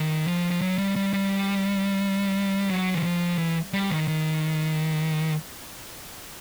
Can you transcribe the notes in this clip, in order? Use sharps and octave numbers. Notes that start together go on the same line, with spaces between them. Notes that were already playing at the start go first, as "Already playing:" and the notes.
Already playing: D#3
F3
F3
F#3
G3
G3
G3
F#3
E3
F3
E3
G3
D#3
D#3